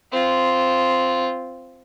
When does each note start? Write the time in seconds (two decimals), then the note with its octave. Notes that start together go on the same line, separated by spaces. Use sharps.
0.12 C4 F4